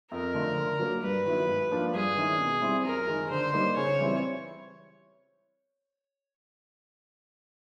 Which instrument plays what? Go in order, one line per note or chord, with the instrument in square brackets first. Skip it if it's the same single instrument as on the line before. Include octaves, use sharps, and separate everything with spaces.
[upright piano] F2 [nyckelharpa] A#4
[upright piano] D3 F3 A3
D3
F#3 A#3
[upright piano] G2 [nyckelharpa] B4
[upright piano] D#3 F#3 B3 E4
G#2
F3 A#3 D4 F4
[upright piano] G2 [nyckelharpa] G#4
[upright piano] D#3 G#3 C#4 E4
B2
G3 C4 E4
[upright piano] F#2 [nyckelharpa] A#4
[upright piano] D#3 G#3
[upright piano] D3 [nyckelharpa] C5
[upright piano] G3 A#3 D#4
[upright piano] C#3 [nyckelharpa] C#5
[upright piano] E3 G3 C4 E4